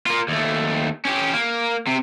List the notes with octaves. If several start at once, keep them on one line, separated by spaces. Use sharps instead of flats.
A#3 F4
D#2 A3
C#4 G4
A#3
C3